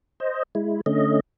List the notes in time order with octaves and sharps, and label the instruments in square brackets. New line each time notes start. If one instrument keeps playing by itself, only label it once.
[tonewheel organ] C5 D#5
G#3 E4
D3 A3 C#4 D#5